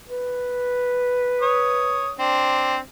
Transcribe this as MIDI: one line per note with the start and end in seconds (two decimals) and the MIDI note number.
0.08 2.11 71
1.41 2.11 73
1.41 2.11 87
2.19 2.78 60
2.19 2.78 62